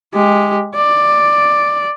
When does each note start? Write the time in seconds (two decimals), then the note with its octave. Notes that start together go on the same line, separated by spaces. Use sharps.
0.14 G#3 G4
0.75 D5